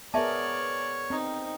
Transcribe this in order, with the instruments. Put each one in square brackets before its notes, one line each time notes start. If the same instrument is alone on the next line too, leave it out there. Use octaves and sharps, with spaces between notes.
[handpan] B3 G#4 A#4 [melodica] C#5 [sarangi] D5 [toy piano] E5 A5
[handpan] C4 [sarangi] D#4